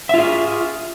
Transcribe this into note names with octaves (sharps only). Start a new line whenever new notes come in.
F4 G#4 E5